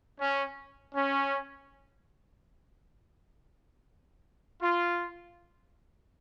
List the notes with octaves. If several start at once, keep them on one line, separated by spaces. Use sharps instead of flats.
C#4
C#4
F4